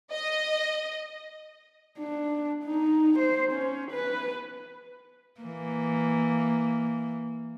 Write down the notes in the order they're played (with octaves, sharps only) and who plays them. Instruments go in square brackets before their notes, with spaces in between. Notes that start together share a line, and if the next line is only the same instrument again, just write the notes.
[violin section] D#5
[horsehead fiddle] D4
D#4
C5
C#4
B4
[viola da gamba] E3 A#3